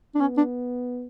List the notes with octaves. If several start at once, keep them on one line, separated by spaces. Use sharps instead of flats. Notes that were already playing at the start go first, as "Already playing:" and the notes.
D4
B3 C#4
D4